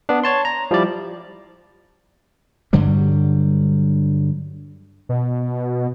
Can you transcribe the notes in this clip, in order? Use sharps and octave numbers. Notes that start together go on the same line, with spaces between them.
B3 D4
C#5 A5 C6
A#5
F3 G3 E4 D5
G2 D3 F#3 G3
B2